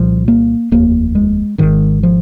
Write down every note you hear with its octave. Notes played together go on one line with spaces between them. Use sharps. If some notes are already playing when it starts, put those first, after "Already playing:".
Already playing: C2 A#2 F3
A#3
F1 D#2 A#3
G#3
G#1 G#2 D#3
F3